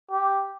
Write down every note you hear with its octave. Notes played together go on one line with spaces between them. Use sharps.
G4